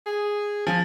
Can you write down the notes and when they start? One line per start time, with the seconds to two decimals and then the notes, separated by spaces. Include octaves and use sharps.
0.06 G#4
0.67 F3 G#5